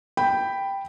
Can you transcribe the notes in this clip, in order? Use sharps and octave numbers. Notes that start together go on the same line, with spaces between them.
G5 B5